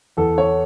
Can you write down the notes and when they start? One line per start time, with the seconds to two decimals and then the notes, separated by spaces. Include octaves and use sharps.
0.17 E2 A4
0.38 C#5